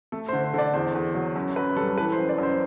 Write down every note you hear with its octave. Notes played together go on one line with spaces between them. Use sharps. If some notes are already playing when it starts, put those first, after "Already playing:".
A3 A4
C5
D3
C5
D3 D5
E2 C5
E2
F#3
F#2
F#2 B4
G3 A4
E3 B4
C5
F#2
D5
F#2 C5